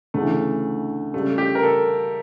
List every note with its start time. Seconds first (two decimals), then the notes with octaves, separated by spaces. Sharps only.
0.14 D2 C#3 E3 A3
1.13 C#2 C#3 G3 A3
1.38 G4
1.55 A#4
1.63 A4